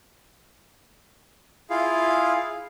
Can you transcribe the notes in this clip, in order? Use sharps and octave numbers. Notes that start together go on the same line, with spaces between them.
E4 F4 G#4 F5